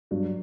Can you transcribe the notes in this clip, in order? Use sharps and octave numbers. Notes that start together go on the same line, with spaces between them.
G2 F#3